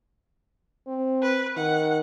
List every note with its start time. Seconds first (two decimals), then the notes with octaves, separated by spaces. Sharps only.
0.88 C4
1.22 B4
1.57 D#3 F#5